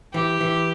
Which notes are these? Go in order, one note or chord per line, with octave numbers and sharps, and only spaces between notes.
E3 G4
E3